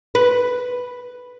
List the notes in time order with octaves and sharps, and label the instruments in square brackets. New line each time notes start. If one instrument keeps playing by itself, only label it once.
[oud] B4